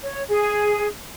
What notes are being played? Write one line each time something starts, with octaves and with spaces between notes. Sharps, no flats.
C#5
G#4